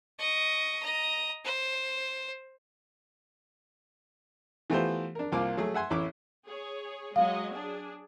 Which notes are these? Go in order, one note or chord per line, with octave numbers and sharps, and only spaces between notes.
D#5 C#6
D#5 A#5
C5
E3 A3 B3 F4 G4 C5
D4 A#4
C2 A#3 F4 D6
F#3 A3 G#4
E5 F#5 G#5 C6
A1 E4 C#5 D6
G#4 C#5
F#3 G#3 D#5 F5
D4 G#4